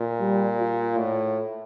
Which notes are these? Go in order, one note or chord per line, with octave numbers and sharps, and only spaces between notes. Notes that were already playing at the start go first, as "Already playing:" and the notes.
Already playing: A#2
G3
F4
A2